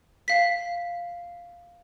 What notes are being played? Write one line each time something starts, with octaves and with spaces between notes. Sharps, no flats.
F5 B6